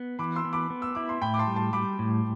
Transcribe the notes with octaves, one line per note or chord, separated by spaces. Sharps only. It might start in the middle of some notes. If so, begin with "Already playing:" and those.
Already playing: B3
E3 B5 D6
C6 E6
B3
B5 D6
B3
E6
E4 D6
C6
A2 G5 B5
D6
A5 C6
G3
A5 C6
G3 B5 D6
A2